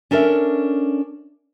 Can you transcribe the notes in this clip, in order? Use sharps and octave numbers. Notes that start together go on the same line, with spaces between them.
C#4 D4 A4 A#4 E5